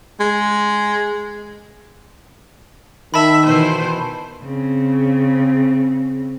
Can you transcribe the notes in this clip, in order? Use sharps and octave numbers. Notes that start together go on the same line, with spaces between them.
G#3
D#3 E5 A5 B5
B2 E3 C5
C#3 C4